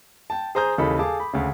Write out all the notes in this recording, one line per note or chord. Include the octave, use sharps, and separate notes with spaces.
G5 A5
G#4 C5 A#5 D#6 G6
D#2 C#3 E3 A4 D#5 B5
G#4 A4 F5 G#5 A5 D6
B5
D2 C#3